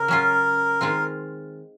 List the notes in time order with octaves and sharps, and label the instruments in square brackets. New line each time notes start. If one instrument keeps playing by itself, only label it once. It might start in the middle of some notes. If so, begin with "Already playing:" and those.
Already playing: [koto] C#3 [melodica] A#4
[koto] F#3 C#4 F4
D#3 G#3 C4 F4